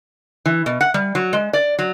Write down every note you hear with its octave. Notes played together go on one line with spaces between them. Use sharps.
E3
B2
F#5
G3
F#3
G#3
D5
F#3